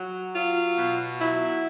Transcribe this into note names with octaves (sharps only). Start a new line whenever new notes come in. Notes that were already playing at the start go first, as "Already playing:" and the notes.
Already playing: F#3
F#3 F4
B2
F#3 E4